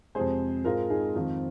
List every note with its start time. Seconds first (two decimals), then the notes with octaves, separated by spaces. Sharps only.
0.15 F2 C3 G#3 C4 G#4 C5
0.65 G#2 G#3 C4 F4 A#4
0.90 D#4 G#4
1.15 F2 D#3 C4 F4